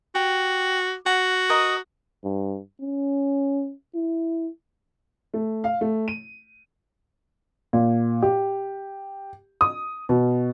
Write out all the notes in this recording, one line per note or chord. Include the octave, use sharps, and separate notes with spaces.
F#4 G4
F#4 F#5
A#4 D#5 D#6
G2
C#4
E4
A3
F5
A3
D#7
A#2
G4
D#6
B2